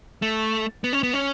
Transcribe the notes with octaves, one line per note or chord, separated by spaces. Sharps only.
A3
B3
C#4
B3
C#4